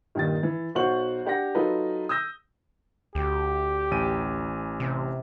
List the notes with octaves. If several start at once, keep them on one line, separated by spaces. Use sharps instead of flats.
G2 A#2 D#3 D#4 A6
E3
B1 F#4 C5 C#6 F#7
D4 G4 F#5 A#6
F#3 D#4 F4 A4 B4
D#6 E6 G6 A#6
D2 G4
A1 G#5 D#7
C3